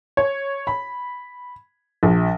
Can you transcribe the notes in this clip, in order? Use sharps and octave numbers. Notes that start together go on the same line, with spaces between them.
C#5
B5
A#1